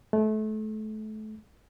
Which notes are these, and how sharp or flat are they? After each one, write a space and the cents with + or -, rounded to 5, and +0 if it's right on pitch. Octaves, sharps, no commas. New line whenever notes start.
A3 -30